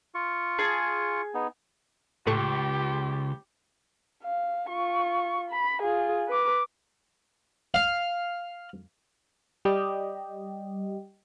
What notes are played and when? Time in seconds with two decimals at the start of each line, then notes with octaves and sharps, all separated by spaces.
0.15 F4 C#6
0.59 G#4 G#5 A5
1.34 B3 D#4
2.27 C#2 A2 A3 G4 C#6
4.24 F5
4.70 F4 C#6
5.50 B5
5.82 F4 G#4
6.28 B4 D6
7.74 F5
9.65 G3 G4 D#5